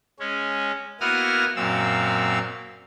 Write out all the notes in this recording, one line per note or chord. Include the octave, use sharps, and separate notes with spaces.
G#3 C#4
A#3 B3 E4 F#4 D#6 F6
F#2 A#2 C4 F5 E6